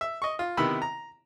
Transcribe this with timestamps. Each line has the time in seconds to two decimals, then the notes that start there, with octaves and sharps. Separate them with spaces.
0.01 E5
0.22 D#5 C#6
0.39 F4
0.57 C3 D#3 B3 E4 B5 E6
0.82 A#5